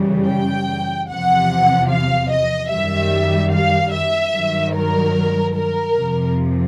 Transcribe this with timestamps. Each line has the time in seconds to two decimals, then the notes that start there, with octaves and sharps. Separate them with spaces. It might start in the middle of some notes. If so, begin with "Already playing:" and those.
Already playing: F#2 C#3 E3 G3
0.28 G5
1.09 E2 C3 F3 F#5
1.90 F5
2.30 D#5
2.70 F#2 D#3 G3 E5
3.52 F5
3.93 E5
4.33 G2 D#3 F#3
4.74 A#4
5.55 A#4
5.95 F2 C3 F3